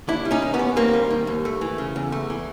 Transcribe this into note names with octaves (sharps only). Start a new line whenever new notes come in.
D#2 D4 E4
G3
C#4 D#4
D#3
B3 C#4
D#2
D#2 A#3 C4
G3
D#3
D#2
A3
E3
C#3
E2
A3
E3